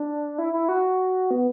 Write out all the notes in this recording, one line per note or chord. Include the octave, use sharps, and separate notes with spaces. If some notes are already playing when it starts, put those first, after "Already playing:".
Already playing: D4
E4
E4
F#4
B3